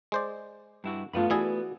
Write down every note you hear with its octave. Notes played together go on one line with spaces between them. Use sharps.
G#3 C5 D5
G2 E4 F#4
G2 A3 B3 F4 B5
E3 E4 F#4 G#4 D5